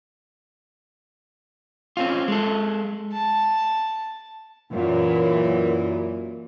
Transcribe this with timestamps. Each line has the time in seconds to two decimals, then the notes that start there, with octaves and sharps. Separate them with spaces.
1.97 C4 C#4 F4
2.28 G#3 A4
3.12 A5
4.71 F#2 A#2 E3